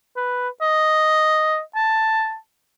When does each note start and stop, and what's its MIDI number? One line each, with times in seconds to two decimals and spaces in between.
0.16 0.49 71
0.61 1.60 75
1.76 2.36 81